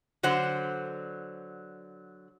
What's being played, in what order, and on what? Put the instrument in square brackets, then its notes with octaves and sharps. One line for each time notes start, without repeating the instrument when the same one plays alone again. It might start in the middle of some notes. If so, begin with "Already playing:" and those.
[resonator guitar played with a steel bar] D3 F#3 C5 F#5